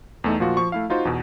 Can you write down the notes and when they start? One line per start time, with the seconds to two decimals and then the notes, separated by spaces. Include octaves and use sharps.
0.24 E2 A3 D#4
0.40 A#2 F3 F4 F#4
0.57 F3 C#6
0.72 A3 E4 F5
0.90 D#4 F4 F#4 C5
1.05 E2 B2